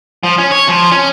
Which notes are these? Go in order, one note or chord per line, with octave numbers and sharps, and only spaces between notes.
F3
C#4
C#5
F3
C#4